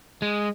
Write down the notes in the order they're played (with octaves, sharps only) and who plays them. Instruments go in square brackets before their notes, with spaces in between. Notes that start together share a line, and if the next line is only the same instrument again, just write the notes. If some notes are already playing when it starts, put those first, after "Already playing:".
[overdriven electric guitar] G#3